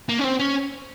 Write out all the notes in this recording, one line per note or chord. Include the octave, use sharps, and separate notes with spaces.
A#3
C#4
C4
C#4